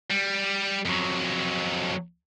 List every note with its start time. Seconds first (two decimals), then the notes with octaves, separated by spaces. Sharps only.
0.11 G3
0.85 F2 F#3